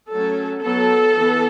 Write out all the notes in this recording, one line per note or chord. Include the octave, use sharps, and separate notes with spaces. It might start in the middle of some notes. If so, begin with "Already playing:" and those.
F#3 A3 C#4 A4
F#3 B3 A4
E3 B3